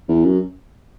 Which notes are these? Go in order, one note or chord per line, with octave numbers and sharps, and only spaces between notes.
E2
F#2